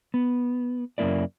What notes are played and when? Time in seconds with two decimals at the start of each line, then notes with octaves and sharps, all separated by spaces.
0.14 B3
0.98 F#2 C#3 G3 A#3 E4 D5